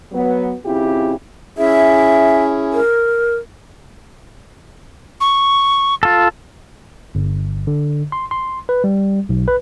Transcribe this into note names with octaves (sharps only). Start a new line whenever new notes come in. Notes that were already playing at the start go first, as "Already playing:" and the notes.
F#3 B3
C#3 C4 E4 F4 G4
C#4 E4 G#4 E5
A#4
C#6
F4 A4
G1
D3
C6
C6
B4
G3
B1
B4